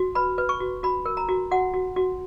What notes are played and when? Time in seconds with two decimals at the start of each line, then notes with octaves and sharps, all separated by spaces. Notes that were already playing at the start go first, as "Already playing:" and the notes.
Already playing: F#4
0.15 B4 B5
0.38 B4
0.49 C#6
0.60 F#4
0.83 F#4 B5
1.05 A#4
1.17 A#5
1.28 F#4
1.51 F#4 F#5
1.74 F#4
1.96 F#4